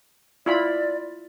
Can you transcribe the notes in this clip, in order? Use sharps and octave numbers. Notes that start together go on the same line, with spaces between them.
E4 F4 D5 B5